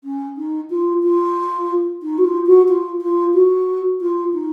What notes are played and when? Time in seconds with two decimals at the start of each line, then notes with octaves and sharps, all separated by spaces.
0.04 C#4
0.37 D#4
0.70 F4
1.03 F4
2.02 D#4
2.18 F#4
2.24 F4
2.46 F#4
2.68 F4
3.01 F4
3.34 F#4
4.01 F4
4.33 D#4